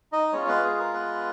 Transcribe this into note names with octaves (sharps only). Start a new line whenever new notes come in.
D#4 D#5
G#3 B3 C#4 F4 C#5
B3 B4
G#4
A#4
B3 B4